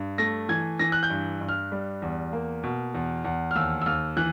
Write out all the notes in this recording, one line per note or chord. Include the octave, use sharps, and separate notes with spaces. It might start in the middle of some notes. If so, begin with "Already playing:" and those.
Already playing: G2
A3 A#6
E3 G#6
E3 A#6
F#6
G6
G2
G2
F6
G3
E2
A#3
B2
E2
E2
F6
D#2 E6
E6
D#2 F6
E3 F#6